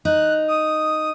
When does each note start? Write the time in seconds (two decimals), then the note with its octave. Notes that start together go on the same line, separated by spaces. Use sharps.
0.05 D#4 F#6
0.48 D#6